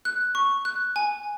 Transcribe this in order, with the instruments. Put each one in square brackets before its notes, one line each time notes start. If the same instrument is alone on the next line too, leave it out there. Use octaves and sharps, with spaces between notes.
[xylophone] F#6
C#6
F#6
G#5